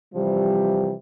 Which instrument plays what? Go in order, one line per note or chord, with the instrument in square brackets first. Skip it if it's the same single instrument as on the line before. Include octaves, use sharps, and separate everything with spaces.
[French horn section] C3 E3 F3 G3